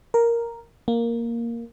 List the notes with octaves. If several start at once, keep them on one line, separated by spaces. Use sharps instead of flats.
A#4
A#3